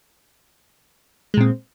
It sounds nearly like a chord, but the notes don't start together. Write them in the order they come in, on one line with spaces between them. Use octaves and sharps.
G#3 A#2 C4